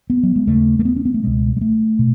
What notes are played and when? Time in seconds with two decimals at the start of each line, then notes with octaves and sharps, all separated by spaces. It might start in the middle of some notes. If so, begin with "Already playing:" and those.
0.10 B3
0.23 F#3
0.36 G#3
0.47 D#2 C#3 A3
0.79 A3
0.85 B3
0.96 C#4
1.05 B3
1.14 A3
1.23 C#2 B2 G#3
1.56 G#3
1.61 A3
1.99 B2